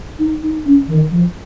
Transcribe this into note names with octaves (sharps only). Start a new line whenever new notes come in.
D#4
D#4
C#4
D#3
F3